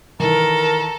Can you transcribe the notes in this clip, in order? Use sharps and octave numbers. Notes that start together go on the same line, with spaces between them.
D#3 E3 A4 A#4 A#5